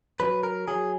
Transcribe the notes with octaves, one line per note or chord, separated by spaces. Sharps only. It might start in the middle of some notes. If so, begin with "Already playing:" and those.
F#3 B4
A#4
F#3 G#4